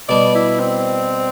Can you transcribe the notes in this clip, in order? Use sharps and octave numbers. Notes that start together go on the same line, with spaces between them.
B2 G3 B3 D4 D5
E4
C4